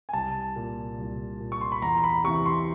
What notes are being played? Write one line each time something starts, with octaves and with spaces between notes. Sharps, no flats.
G#5
C2 A5
A#2
C2
A#2
C#6
C6
B5
E2 A#5
B5
C3 E3 C#6
C6